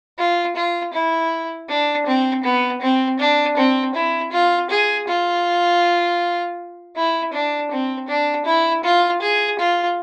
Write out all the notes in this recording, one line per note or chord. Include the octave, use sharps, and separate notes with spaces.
F4
F4
E4
D4
C4
B3
C4
D4
C4
E4
F4
G#4
F4
E4
D4
C4
D4
E4
F4
G#4
F4